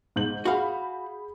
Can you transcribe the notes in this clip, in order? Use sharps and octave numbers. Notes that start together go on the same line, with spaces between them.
G#2 G6 F#7
F#4 G#4 F5 B5